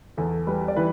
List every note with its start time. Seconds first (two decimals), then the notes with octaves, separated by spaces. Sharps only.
0.17 E2 A4
0.47 G3 B4
0.68 D5
0.76 E3 B4